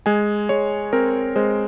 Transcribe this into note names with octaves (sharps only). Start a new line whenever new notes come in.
G#3 G#5
G#3 C#5
C4 A#4
G#3 C5